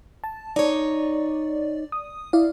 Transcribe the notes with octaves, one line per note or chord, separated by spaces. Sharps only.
A5
D#4 C#5 D5
D#6
E4 D5 F5